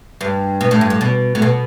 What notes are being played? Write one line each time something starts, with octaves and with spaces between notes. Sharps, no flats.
G2
B2
A2
G2
A2
B2
A2
B2